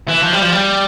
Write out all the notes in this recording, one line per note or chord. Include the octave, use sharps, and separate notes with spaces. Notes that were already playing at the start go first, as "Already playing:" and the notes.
E3
F3
G3
F3
G3